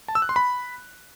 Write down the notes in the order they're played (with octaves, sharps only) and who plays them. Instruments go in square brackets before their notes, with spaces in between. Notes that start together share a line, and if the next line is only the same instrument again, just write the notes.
[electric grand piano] A5
E6
F#6
C6
B5